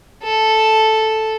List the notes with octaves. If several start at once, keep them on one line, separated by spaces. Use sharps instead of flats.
A4